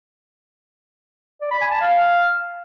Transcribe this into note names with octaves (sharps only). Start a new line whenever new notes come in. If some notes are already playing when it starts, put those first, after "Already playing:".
D5
B5
G#5
A5
F5